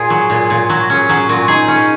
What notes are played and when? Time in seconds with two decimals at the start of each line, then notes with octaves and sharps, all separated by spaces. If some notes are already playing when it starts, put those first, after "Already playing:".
Already playing: A#2 G#4
0.10 F#3
0.30 A#2
0.50 A#2
0.69 F#3 F#4
0.81 F#4
0.90 C#4 G#4
1.09 F#3 G#4
1.29 A#2 F#4
1.48 D#4 G#4
1.68 C#4